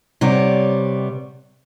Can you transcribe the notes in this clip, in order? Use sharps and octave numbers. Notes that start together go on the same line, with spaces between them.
C3 G3 B3 C#5 D5